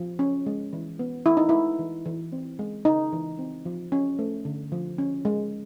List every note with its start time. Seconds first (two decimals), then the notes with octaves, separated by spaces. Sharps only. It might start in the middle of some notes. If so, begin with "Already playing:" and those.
Already playing: F3
0.19 C#4
0.46 G#3
0.73 E3
0.99 B3
1.26 E3 E4
1.37 D#4
1.49 G#3 E4
1.79 E3
2.06 E3
2.32 C4
2.59 G#3
2.85 C#3 D#4
3.13 E3
3.39 C4
3.65 F3
3.92 C#4
4.19 A3
4.45 D3
4.72 F3
4.98 C#4
5.25 G#3